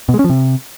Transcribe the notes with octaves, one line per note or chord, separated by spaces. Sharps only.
B2
G#3
C#4
F3
C3